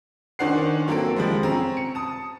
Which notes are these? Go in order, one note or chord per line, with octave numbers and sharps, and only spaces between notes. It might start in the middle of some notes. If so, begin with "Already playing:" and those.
D#3 C#4 D4 C5 F#5 C7
F#3 A#3 C4 A4 D7
F3 G3 G#3
C4 C#4 A#5
C#7
A5 D#6